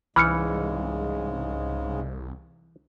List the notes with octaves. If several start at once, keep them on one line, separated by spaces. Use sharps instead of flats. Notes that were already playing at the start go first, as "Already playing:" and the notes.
C2 G#2 C#3 E3 G#3 B5 F6 C#7